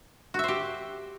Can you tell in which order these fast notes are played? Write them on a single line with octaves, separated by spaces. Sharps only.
F#4 E5 C5 G4